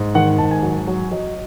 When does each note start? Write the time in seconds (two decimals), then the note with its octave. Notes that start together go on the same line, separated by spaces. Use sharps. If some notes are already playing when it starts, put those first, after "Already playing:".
Already playing: G#2
0.15 D#3 F#5
0.38 G#2 A5
0.51 G#5
0.63 F#3
0.87 F#3
1.12 F#3 D#5